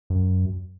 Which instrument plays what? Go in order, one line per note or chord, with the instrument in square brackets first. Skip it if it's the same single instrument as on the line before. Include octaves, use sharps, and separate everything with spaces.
[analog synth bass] F#2